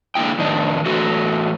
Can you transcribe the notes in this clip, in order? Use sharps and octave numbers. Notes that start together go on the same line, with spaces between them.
D3 G#3 A#3 E4 G5
F2 A2 D#3 D4 D#4
A2 E3 F#4 A4 B4